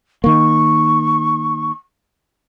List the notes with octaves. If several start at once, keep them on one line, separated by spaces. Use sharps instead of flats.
D#3 A#3 C#6